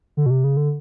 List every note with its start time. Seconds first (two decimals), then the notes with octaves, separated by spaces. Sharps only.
0.17 D3
0.26 B2
0.30 C3
0.44 C#3
0.57 D3